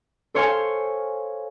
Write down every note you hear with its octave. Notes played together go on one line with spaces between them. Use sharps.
A4 C5 C#5 F5 G#5